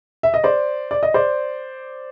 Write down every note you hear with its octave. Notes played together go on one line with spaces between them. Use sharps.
E5
D#5
C5 D5
D5
D#5
C5 D5